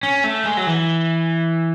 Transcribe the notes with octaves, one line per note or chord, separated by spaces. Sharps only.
C#4
A3
G#3
F#3
E3